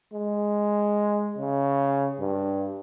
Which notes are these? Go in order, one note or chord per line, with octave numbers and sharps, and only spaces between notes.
G#3
C#3
G2